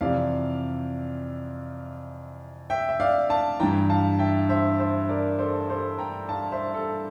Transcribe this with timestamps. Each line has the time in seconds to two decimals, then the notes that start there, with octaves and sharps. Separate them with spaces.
0.01 F2 C3 E3 D5 F5
2.70 E5 G5
2.89 E5
3.00 D5 F5
3.29 F5 A5
3.60 G2 E3 G5 A#5
3.90 F5 A5
4.19 E5 G5
4.49 C5 E5
4.79 C5 E5
5.09 A#4 D5
5.39 A4 C5
5.69 A4 C5
5.99 G5 A#5
6.29 F5 A5
6.52 C5 E5
6.74 A4